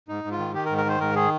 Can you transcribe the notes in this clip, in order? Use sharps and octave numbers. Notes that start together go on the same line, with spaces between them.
G#2 D#4
G#2
F4
D#3
D#3 G4
A#4
G#2
A#4
D#3 C5
G#2 A#4
D#3 G#4